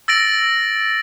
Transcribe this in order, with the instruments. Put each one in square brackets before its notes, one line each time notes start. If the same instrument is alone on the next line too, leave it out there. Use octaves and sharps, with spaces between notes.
[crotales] E6 A6 A#6 D7 F#7